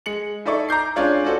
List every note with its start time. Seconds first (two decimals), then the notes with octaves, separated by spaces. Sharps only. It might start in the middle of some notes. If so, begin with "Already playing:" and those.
0.06 G#3 C#7 F#7
0.45 D#4 E4 A4 D5 C#6
0.69 A#5 D6 G6 C7
0.96 G#3 C#4 D4 F4 C#5 F5
1.23 C#4 D4 F#4 A4 C5